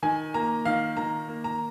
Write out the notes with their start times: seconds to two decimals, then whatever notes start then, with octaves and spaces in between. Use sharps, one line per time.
0.03 D#3 G#5
0.34 A#3 A#5
0.65 D#3 F5
0.97 D#3 A#5
1.28 A#3
1.44 A#5